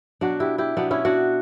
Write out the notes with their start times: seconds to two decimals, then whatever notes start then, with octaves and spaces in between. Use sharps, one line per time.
0.21 B2 F#3 D4 F#4
0.40 E4 G4
0.58 E4 G4
0.76 B2 F#3 B3 D4
0.91 C#4 E4
1.05 D4 F#4